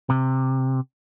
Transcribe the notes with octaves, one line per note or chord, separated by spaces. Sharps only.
C3